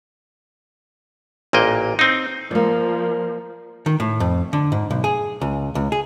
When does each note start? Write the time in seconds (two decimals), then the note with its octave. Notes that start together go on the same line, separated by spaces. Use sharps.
1.53 A1 A#2 A#3 D#5 G5
1.99 C4 D#4
2.51 F3 A#3 A#4 D5
3.86 D#3
4.00 A2
4.20 F2
4.53 D3
4.72 G#2
4.91 B1
5.04 G#4
5.41 C#2
5.75 C#2
5.92 G#4